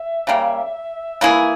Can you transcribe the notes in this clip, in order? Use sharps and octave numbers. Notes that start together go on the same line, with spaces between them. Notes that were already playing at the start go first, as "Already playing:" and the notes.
Already playing: E5
C#3 G3 A#3
E3 A#3 E4 G#4